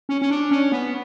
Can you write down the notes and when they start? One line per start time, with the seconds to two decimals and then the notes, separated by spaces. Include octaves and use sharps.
0.09 C#4
0.22 C#4
0.30 D4
0.51 C#4
0.72 B3